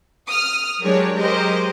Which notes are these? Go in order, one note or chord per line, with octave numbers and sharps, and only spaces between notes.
D#6 F6
F#3 G#3 D4 G4 A#4 C#5
F#3 G#3 G4 A#4 C5 D#5